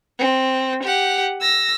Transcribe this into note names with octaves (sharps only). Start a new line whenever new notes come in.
C4
G4 F#5
E6 A#6